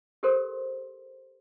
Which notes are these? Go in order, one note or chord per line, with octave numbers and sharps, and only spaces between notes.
G4 A4 A#4 C5 C6